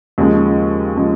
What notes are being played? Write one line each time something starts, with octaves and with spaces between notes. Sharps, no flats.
D#2 C#3 F3 G#3
C#3 F3 G#3